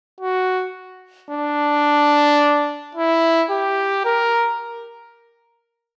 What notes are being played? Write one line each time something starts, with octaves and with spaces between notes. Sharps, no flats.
F#4
D4
E4
G4
A#4